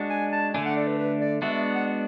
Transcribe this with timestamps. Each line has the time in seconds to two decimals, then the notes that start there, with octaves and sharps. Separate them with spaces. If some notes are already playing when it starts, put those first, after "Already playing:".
Already playing: G#3 D4 F#4
0.10 G#5
0.32 A5
0.54 D3 A3 D4 G#5
0.65 F#5
0.77 D5
0.87 B4
0.98 B4
1.20 D5
1.42 G#3 B3 D4 F#4 E5
1.53 E5
1.75 F#5
1.87 D5